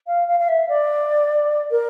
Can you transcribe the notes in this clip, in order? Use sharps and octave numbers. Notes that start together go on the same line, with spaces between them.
F5
F5
F5
E5
D5
A#4